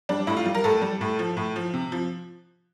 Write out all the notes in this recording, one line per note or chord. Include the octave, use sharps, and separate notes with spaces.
G3 D4
A2 E4
F4
G3
A#4
A2 A4
G3
A2
F3
A2
F3
C3
F3